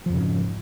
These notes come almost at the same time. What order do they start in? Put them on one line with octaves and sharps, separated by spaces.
F3 F2 C#3 G#2